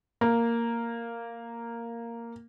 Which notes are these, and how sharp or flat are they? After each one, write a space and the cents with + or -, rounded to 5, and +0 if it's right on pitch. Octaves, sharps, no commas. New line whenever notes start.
A#3 -5